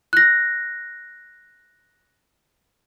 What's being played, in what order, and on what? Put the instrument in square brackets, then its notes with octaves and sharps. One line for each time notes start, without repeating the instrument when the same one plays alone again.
[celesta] F#6 A#6